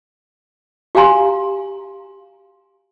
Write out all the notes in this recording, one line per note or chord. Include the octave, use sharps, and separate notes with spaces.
F#4 G4 F5 G#5 A#5 C6